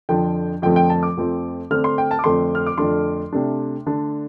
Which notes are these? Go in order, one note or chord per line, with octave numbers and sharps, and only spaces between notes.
F2 D3 F3 D4 G5
F2 D3 F3 A3 C4 G5
G5
A5
D6
F2 F3 A3 C4
D3 A3 C4 F6
C6
G5
A5
D6
F2 D3 A3 C4 C6
F6
D6
F2 D3 A3 D4 C6
C3 A3 D4
D3 A3 D4